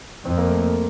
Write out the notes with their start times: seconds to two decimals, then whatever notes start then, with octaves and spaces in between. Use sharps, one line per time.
0.24 F2 C4
0.38 A#3
0.49 A3
0.61 A#3